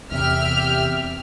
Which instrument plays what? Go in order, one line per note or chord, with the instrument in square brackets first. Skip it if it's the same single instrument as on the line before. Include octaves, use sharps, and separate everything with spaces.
[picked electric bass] E2 C3 [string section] G4 E5 G5 [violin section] F6